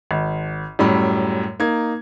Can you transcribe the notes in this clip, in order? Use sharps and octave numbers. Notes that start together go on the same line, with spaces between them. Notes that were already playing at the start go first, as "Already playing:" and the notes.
G#1
F#2 A2 G3 B5
A#3 D#4 G#6